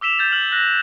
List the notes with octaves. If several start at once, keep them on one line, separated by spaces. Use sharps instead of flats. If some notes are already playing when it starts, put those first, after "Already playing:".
D6 E6 B6 E7 F7
G6 A6
F6 F#7
F#6 A#6